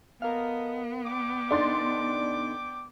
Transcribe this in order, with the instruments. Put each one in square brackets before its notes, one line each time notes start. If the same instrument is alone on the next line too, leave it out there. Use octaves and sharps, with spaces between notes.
[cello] B3 [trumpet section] A4 D#5 [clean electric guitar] A#4 F5
[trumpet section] D5 G5 D6
[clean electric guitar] B2 D3 D#4 [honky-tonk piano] D4 C6 A6